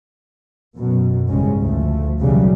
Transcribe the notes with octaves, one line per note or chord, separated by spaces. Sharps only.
F#2 B2
A1 G#2 C#3 G3 G#3 C#4
D2 F3 A3
B1 C#3 E3 F#3 G3